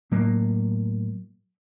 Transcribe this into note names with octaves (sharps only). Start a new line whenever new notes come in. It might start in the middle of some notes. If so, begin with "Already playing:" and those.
A2 F#3 A#3